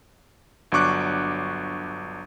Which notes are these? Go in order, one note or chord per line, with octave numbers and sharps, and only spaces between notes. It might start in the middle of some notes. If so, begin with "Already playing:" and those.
G1 F#3 D4 C#6 D6 F#6